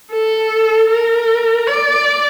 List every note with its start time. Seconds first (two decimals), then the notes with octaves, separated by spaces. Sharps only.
0.12 A4
0.90 A#4
1.68 D5